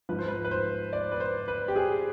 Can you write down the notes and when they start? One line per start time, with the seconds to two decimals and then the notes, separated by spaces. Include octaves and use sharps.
0.09 G#2 F3 B4
0.19 C5
0.28 B4
0.44 B4
0.51 C5
0.93 D5
1.12 B4
1.20 C5
1.48 B4
1.68 G4
1.76 G#4